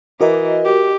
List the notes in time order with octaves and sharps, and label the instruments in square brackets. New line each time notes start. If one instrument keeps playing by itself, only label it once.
[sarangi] E3 [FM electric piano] F#4 A#4 D#5
[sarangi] G4